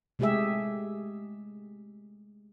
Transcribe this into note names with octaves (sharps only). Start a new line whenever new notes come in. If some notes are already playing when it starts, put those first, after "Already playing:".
C3 G#3 A3 G4 G#4 E5